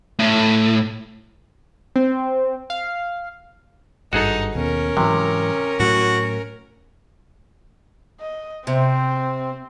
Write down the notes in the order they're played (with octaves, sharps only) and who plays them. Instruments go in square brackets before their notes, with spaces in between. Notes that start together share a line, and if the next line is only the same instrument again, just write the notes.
[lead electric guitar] A2
[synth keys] C4
F5
[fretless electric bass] G#1 G2 [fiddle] D#4 [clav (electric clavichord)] F#4 G#4 A4
[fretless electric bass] D#2 B2 [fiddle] C#4 A#4
[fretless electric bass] G#2 E3 F#3 [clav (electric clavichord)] C3
[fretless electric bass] A2 F#3 [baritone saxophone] F#4
[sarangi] D#5
[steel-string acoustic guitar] C3 [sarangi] C4